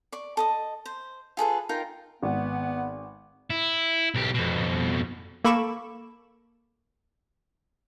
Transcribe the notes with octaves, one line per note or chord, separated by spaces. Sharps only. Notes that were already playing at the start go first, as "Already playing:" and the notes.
D5 C#6
A4 D#5 D#6
C5
F4 G#4 A4 B4
D#4 F4 A#4 G5
G#1 B3 F#5
E4
B1 G4
F2 B2
A#3 A4 B5 C#6 D6 E7